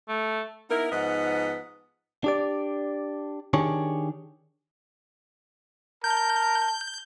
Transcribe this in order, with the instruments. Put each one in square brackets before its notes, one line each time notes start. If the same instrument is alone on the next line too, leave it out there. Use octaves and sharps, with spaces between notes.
[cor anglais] A3
[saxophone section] B3 D#4 E4 A#4
G#2 F3 B3 D#4 D#5 F#5
[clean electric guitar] D4 G4 D5
D#3 D4 G4 G#4 C#5
[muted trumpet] A#4 [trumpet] A5 [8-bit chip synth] G6